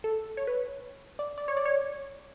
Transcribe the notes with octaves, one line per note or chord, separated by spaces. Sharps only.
A4
C#5
B4
D5
D5
C#5
D5
C#5